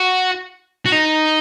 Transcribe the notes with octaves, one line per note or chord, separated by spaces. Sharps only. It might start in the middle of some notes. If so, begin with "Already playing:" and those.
Already playing: F#4
F#4
D#4